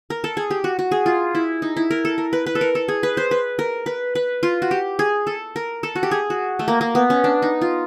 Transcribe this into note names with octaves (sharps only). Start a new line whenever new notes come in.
A#4
A4
G#4
G4
F#4
F#4
G#4
F4
E4
D#4
E4
A#4
A4
A#4
B4
B4
A4
A#4
A4
G#4
B4
C5
B4
A#4
B4
B4
F4
F#4
G4
G#4
A4
A#4
A4
F#4
G4
G#4
F#4
A3
A#3
A#3
B3
C#4
D4
D#4
F4